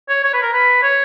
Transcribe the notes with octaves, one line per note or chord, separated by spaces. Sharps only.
C#5
C#5
B4
A#4
B4
C#5